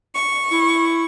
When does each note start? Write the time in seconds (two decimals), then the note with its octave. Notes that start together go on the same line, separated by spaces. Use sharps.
0.14 C#6
0.51 E4